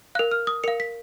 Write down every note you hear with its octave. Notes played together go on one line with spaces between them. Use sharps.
A#4 F5 F#6
F6
D#6
A#4 F5 C#7
B6